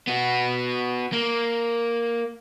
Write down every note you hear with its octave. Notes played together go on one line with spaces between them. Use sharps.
B3 F#4
A#3